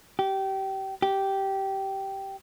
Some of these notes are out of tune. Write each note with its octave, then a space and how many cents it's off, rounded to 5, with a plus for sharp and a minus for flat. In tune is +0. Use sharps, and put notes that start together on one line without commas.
G4 -25
G4 -10